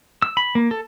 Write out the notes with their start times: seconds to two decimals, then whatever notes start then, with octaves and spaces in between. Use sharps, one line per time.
0.22 E6
0.37 B5
0.55 A#3
0.71 A4